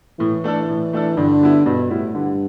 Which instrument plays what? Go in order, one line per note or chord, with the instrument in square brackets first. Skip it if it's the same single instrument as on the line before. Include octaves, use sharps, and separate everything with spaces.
[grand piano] A2 [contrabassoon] E3
[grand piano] A3 D4 A4
A2
A3 D4 A4
[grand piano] G2 [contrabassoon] D3
[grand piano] G3 B3 E4
[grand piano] G2 [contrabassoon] B2
[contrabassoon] A2 [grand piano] G3 B3 E4
[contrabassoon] G2 [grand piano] D3